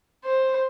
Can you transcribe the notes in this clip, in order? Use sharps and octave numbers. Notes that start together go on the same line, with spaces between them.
C5